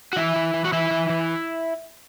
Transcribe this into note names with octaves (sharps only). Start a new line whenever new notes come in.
F#4
E3 E4
E3
E3
F#4
E3 E4
E3
E3